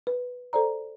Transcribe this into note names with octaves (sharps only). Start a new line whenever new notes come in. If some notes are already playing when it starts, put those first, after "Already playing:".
B4
A4 C5 D5 A#5